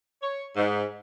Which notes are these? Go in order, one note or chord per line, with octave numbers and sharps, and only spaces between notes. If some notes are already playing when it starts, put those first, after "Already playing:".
C#5
G#2